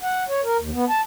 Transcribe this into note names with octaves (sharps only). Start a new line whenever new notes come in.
F#5
C#5
A#4
D#2
B3
A5